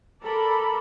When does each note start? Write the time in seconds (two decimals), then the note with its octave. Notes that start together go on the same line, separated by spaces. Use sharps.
0.24 A4 A#4 D5 B5